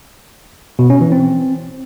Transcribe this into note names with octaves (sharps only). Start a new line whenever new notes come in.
B2
C#4
E3
C4